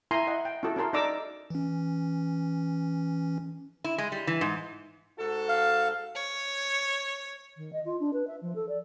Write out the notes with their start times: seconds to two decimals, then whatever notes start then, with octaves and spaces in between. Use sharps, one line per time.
0.11 E4 A#4 G#5 A#5 C6
0.27 D#5 F#5
0.45 G5
0.63 C#4 E4 F#4 A4
0.76 C#4 F#4 G#4 A#4 A5 C6
0.93 D#4 A4 D5 A#5 D6 E6
1.50 E3 C#4
3.84 E4
3.98 G#3
4.12 G3
4.27 E3
4.41 G#2
5.19 G#2 F#4 A4
5.49 F5
6.15 C#5
7.56 D#3
7.72 D#5
7.85 F4
8.00 D4
8.13 B4
8.27 E5
8.41 F3
8.55 A4
8.68 D5